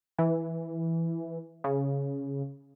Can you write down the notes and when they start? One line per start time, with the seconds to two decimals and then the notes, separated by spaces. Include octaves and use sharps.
0.19 E3
1.64 C#3